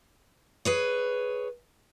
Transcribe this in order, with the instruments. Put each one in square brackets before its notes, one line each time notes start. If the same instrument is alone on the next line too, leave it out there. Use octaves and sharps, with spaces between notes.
[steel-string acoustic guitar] G#4 B4 C#5